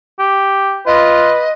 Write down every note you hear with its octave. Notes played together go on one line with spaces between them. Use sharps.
G4
F4 B4 D#5